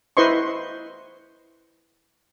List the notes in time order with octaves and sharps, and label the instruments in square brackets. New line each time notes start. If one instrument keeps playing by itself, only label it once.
[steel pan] E4 B4 C5 D#5 C6 C#6